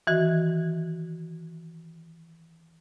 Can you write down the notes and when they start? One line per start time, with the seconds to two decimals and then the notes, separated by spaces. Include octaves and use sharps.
0.07 D#3 E3 F#4